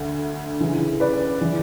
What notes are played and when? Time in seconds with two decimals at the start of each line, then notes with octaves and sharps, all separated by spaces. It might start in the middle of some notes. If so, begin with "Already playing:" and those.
Already playing: D2 D3
0.60 C#2 C#3 E3
1.00 B4 D5
1.41 C#3 E3